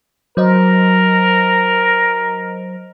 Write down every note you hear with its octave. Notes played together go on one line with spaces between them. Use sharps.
F#3 A#4 C5 D#5